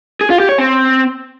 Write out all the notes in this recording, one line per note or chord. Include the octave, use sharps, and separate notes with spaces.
G#4
F4
G4
C#5
C4